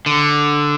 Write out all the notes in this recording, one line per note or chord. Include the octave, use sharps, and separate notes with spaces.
D3